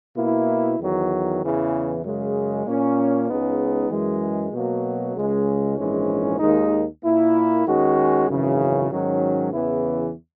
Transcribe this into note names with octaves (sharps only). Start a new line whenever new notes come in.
B2 A#3 E4
E2 D#3 F#3
E2 C#3 E3
F#2 C#3 G#3
A#2 A#3 C#4
C#2 C#3 G#3 B3 D#4
F#2 E3 G#3
B2 F#3 A#3
C#2 C#3 G#3
A#1 G#2 E3 G#3 C#4
D#2 D#3 G#3 D#4
A#2 A#3 E4
D#2 D#3 G#3 C#4 F#4
G#1 F#2 C#3 E3
G#2 D#3 F#3 C#4
E2 C#3 E3 B3 E4